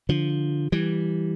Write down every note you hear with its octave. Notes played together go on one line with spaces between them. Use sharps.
D3 F3
E3 G3